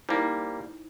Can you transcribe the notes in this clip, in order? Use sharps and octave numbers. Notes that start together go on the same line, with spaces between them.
G3 A#3 D#4 E4 C5